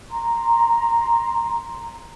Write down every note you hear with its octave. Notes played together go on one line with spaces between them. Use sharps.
A#5 C6